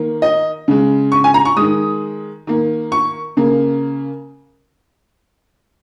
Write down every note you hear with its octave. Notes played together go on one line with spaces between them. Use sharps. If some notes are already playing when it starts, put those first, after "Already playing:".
Already playing: D#3 A#3
D#5
C#3 G#3
C#6
G#5
A#5
C#6
D#3 G#3 D#6
D#3 A#3
C#6
C#3 A#3